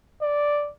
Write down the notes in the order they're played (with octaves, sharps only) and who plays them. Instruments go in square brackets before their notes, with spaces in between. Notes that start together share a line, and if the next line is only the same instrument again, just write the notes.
[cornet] D5